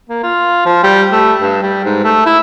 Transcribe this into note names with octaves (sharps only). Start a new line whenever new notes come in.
A#3
F4
F3
G3
A3
G2
G3
G#2
A3
E4